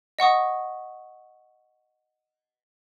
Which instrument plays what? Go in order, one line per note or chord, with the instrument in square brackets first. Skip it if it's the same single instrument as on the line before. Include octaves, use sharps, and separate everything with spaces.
[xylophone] D#5 F#5 C#6 D#6